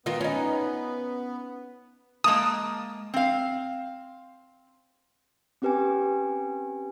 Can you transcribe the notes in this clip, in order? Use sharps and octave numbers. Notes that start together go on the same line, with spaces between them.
D#3 B3 F4
C#4 D#4
G#3 A#3 A5 D#6
C4 F5
C4 C#4 G4 B4 G5 G#5